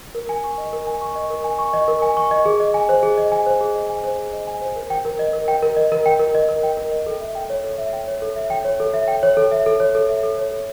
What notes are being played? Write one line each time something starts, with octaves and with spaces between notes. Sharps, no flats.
A#4
G#5
C#6
D#5
A#4
G#5
C#6
D#5
A#4
G#5
C#6
D#5
A#4
G#5
C#6
D#5
G#4
D#5
G#5
C5
G#4
D#5
G#5
C5
G#4
D#5
G#5
C5
G#4
D#5
G#5
C5
A#4
G5
A#4
D#5
A#4
G5
A#4
D#5
A#4
G5
A#4
D#5
A#4
G5
A#4
D#5
A4
E5
G5
C#5
A4
E5
G5
C#5
A4
E5
G5
C#5
A4
E5
G5
C#5
A4
E5
A4
C#5
A4
E5
A4
C#5
A4